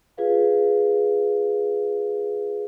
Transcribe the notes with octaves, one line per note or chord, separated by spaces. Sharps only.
F4 G#4 B4 F5